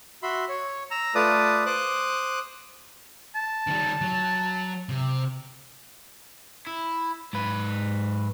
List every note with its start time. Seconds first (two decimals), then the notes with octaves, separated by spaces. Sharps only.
0.23 F#4 E5 B5 C6
0.49 C#5
0.91 A#5 E6
1.15 A3 F4 B4 D5 A5 D#6
1.66 C5 D6 D#6 F#6
3.36 A5
3.67 D#3 G3
4.01 F#3
4.89 C3
6.67 E4
7.33 G#2 B4